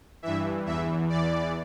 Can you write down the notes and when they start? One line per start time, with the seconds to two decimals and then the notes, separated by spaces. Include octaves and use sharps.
0.23 G2 E3 E5
0.66 E2 E3 E5
1.09 E2 E3 D5